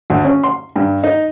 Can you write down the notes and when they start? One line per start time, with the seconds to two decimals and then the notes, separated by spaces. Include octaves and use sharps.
0.10 D2
0.25 C#4
0.43 C6
0.76 G2
1.04 D#4